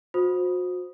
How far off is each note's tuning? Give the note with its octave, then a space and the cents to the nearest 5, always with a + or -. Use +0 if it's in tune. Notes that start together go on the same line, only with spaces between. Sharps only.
F#4 -35 C5 +0 D#6 +0